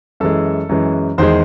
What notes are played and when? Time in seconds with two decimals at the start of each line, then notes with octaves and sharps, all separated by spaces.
0.20 F#2 E3 G#3 A4
0.69 F#2 E3 G#3
1.18 E2 D#3 G#3 C5